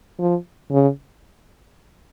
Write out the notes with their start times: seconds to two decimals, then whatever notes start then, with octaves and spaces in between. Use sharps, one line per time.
0.19 F3
0.71 C#3